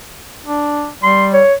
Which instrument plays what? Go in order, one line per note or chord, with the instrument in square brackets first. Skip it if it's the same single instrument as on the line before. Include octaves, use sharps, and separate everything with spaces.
[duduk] D4
[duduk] G3 [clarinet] C6
[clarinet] C#5